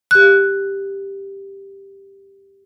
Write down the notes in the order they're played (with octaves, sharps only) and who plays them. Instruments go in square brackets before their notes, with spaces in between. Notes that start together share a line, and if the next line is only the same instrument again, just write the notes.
[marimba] G4 F#6